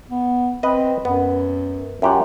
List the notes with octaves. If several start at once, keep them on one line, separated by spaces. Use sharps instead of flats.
B3
C4 B4 D#5
F#2 B3
F#2 F4 G4 F#5